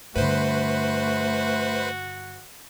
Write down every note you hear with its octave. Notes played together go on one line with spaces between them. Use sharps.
G2 D3 A3 F#4 B4 C5